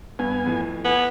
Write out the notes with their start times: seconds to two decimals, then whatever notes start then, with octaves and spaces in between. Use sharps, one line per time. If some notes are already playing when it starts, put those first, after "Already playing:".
0.19 G2 B3 G#5
0.46 F2 A2
0.85 B3 G#5